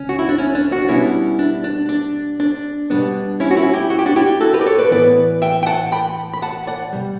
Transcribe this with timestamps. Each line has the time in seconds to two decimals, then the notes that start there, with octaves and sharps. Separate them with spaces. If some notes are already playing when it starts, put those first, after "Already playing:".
Already playing: C#2 C#4
0.09 F#4
0.19 E4
0.29 D4
0.38 C#4
0.55 D4
0.72 D4 F#4
0.88 B2 G3 B3 C#4 E4
1.39 D4
1.64 D4
1.89 D4
2.40 D4
2.90 B2 G3 B3 D4
3.40 C#4 E4
3.51 F#4
3.57 C#4 E4
3.74 E4 G4
3.90 F#4
3.99 G4
4.06 D4 F#4
4.16 E4 G4
4.41 F#4 A4
4.54 G4 B4
4.61 D5
4.66 A4 C#5
4.79 B4 D5
4.91 A2 E3 B3 B4 D5
5.42 E5 G5
5.63 G5
5.66 F#5 A5
5.92 G5 B5
6.34 B5
6.42 F#5 A5
6.67 D5 F#5
6.93 B2 G3